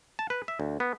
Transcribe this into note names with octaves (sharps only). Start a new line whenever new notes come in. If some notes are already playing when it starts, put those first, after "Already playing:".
A5
B4
E5
D2
B3